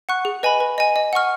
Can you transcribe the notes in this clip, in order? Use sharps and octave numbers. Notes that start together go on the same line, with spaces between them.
F#5 C#6 F#6
G#4
B4 D#5 G#5 B5
B4
D#5 G#5
D#5
F#5 C#6 F6